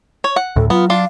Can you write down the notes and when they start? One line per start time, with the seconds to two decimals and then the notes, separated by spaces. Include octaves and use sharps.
0.24 C#5
0.36 F#5
0.56 D2 A2 A4
0.70 F#3 B3 F4
0.90 D4 F4 F5